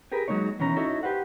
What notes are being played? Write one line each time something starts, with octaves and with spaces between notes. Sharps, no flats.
G4 G#4 A#4 B4
F#3 G#3 A#3 D#4 C#5
B2 D#3 E3 C#4 A#5
D#4 E4 F#4 A4 C#5
G4 B4 C5 F#5